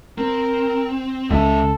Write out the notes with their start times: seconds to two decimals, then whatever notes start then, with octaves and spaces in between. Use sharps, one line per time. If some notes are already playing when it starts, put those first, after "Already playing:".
0.18 C4 A#4
1.30 C#2 C#3 A4 E5